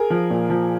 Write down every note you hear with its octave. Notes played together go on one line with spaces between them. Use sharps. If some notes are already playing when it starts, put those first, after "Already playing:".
Already playing: G#4 A#4
F3
A#2
F3